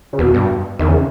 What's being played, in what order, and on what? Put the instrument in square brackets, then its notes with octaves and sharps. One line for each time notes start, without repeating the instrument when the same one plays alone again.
[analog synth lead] C#3
[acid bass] E2 [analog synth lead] B2
[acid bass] G2
[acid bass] E2 [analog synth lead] D#3
[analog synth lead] C#3